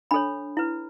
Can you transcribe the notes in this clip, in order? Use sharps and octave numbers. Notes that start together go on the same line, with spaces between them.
D4 A4 C#5 B5
E4 B4